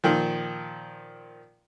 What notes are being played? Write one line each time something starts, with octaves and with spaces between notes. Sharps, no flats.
A#2 D#3 F3